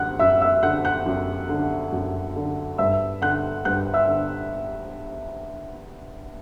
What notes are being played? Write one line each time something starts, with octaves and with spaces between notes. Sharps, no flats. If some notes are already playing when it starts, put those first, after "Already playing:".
Already playing: F#2 D3 F#5 F#6
F#2 E5 E6
E5 E6
D3 F#5 F#6
F#5 F#6
F#2
D3
F#2
D3
G2 E5 E6
D3 F#5 F#6
G2 F#5 F#6
E5 E6
D3